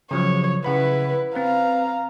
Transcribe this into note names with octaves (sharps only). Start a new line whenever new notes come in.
C#3 F3 F#3 C#5
C#3 E4 B4 F#5 B5
C4 B4 F5 A#5